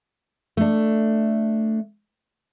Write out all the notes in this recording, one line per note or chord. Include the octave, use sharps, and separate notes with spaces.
A3 D4